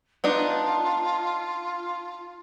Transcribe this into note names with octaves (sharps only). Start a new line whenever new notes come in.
B3 D4 D#4 F4